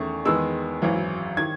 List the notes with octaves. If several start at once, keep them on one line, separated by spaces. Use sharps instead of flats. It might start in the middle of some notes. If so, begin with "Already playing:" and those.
Already playing: E2 D#3 A3 C#4 C#6
E2 D#3 G#3 B3 E6
G#1 F#2 E3
D#3 G#6